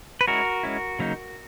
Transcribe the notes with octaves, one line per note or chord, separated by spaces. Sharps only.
B4
G#3 C#4 E4 F#4 A#4
G#3 C#4 E4
C#3 F#3 A#3 D#4